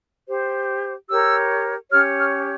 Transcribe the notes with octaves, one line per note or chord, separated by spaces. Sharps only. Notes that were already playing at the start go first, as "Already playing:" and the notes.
G4 C5
G4 A#4 C#5 E6
C#4 G4 C#5 F6
F6